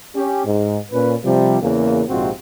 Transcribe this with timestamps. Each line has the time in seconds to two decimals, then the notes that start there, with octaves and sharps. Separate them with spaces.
0.15 C#4 G4
0.45 G#2
0.92 A#2 C#4 B4
1.24 C3 F3 G3
1.62 E2 C#3 E3 A#3
2.08 A#1 G#2 C3 C4 F4 F#4